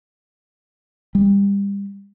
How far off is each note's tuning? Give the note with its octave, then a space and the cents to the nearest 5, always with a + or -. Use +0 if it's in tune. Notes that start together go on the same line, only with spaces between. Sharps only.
G3 +30